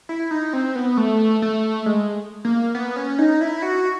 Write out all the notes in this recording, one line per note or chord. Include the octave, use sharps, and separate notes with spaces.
E4
D#4
C4
B3
A3
A3
G#3
A#3
B3
C#4
D#4
E4
F#4